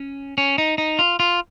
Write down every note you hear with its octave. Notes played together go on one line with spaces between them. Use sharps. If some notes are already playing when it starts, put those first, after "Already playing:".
Already playing: C#4
C#4
D#4
D#4
F4
F4